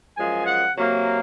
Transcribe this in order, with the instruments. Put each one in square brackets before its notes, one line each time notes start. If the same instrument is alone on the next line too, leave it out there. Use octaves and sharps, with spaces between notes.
[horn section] F#2 F3 G#3 G#5
F#5
C3 F#3 A#3